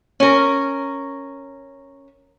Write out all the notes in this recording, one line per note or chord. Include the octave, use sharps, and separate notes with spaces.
C#4 A#4